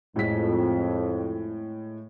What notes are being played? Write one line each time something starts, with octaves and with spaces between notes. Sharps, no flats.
F2 A2 G#3 B6